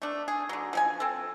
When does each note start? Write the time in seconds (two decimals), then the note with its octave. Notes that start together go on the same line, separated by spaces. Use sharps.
0.02 A3 D4
0.28 G#4
0.49 D3 F#3
0.73 F3 G#4 G#5
1.00 C4 A4